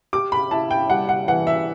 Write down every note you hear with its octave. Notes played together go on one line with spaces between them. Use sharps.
G4 D6
B5
E4 A5
G5
G3 F#5
F#5
E3 F#5
E5